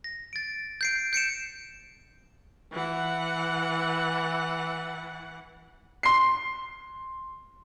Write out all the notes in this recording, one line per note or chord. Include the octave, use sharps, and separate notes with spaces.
A#6
A6 D7
G6 C7 D7
G6 C#7 D7 E7
E3 F#5
C6 C7